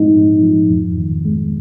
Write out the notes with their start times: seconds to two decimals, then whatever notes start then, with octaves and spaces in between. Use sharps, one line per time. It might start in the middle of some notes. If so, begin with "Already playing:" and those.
Already playing: G#2 F3 G#3 D#4
0.16 G#2
0.43 F3
0.70 F2
0.97 D#3
1.25 G#3